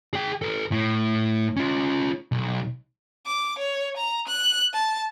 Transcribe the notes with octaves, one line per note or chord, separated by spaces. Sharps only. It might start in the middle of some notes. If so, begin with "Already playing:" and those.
G#4 G5
A4 B4
A2
C#4 F4
B1
D6
C#5
A#5
F#6
A5